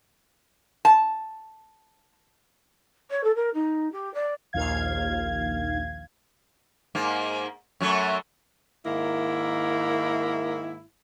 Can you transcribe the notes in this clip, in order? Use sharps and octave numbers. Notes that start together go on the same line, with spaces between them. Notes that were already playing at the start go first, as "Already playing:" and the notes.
A5
C#5
A4
A#4
D#4
G4
D5
A#1 D#2 F5 G#6
G#2 A#3
F#2 F#3 A3
G#2 D#3 A#3 E4